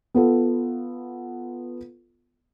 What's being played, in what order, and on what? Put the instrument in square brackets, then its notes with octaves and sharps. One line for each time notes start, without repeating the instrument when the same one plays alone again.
[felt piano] B3 F4 A4